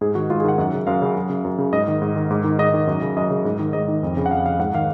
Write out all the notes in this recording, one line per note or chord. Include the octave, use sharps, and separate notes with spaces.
G#2 G#4
D#3 F#4
G#2 F4
G#4
D#3 F#5
F#2
C#3
F#2 F5
C#3
F#2
C#3
F#2
C#3
G#2 D#5
D#3
G#2
D#3
G#2
D#3
G#2 D#5
D#3
F#2
C#3
F#2 D#5
C#3
G#2
D#3
G#2 D#5
D#3
F2
C#3
F#5
F2 F5
C#3 F5
G#2 F#5
D#3 F5